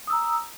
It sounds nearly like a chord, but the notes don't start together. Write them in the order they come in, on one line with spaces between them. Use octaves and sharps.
D#6 E6 A#5